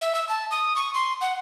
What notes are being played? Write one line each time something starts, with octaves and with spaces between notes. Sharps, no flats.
E5
E6
A5
D#6
C#6
C6
F#5